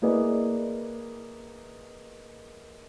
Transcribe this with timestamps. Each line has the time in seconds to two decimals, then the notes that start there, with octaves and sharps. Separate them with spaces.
0.02 A#3 E4 G#4 B4 D5 D#5